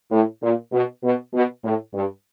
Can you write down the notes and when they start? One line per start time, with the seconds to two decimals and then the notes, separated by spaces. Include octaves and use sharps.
0.11 A2
0.42 A#2
0.72 B2
1.03 B2
1.33 B2
1.64 A2
1.94 G2